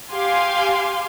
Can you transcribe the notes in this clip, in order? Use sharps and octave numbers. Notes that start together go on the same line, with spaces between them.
G4 F5 G#5 C6